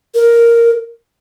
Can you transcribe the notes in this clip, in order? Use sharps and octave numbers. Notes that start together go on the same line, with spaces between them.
A#4